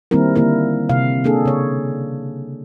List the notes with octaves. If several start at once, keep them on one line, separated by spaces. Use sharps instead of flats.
D#3 G3 A#3 C4 E4 A#4
D3 A#3 E4 A#4
C3 F5
A#3 D4 G#4 A4
C#3 C#5